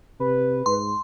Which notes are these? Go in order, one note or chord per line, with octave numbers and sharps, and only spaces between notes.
C3 B4
G#2 C6